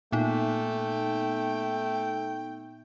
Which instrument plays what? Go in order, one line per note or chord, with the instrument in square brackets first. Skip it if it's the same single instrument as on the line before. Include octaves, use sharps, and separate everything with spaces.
[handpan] A#2 [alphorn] A3 [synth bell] B3 D#4 [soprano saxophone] G5